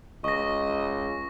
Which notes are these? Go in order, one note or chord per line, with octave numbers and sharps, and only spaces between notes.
C#2 D#5 C#6 A#6